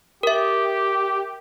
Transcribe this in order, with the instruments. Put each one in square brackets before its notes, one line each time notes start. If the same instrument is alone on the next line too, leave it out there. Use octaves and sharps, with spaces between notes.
[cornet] G4 [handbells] A#4 E5